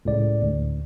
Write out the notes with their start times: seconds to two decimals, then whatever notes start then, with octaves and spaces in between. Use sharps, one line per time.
0.05 C#2 A2 D5
0.42 D2